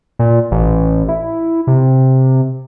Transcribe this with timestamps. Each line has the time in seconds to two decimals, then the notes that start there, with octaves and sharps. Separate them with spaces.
0.19 A#2
0.51 A1
1.09 E4
1.67 C3